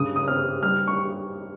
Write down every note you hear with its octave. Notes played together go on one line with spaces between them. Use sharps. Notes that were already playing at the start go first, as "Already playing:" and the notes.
Already playing: G2 C#3 D#6
D#6
C4 F6
G3 F6
C#6